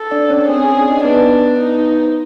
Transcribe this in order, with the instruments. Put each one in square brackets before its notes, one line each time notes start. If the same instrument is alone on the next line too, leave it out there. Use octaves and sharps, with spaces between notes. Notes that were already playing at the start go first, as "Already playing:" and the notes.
Already playing: [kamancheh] A4
[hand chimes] D4 D5
C#4 C#5
C#5
[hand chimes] C4 C5 [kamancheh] G#4
[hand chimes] C#4 C#5
D4 D5
D#4 D#5
[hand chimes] B3 B4 [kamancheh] D4
[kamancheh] D#4
[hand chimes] C5